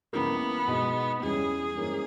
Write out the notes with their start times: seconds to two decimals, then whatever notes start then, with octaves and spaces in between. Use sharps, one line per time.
0.13 C#2 C#3 E3 A#3 B3
0.67 B2 G#3 D#4 G#4
1.23 E2 C#3 G3 C#4 G#4
1.77 G#2 E3 A#3 C#4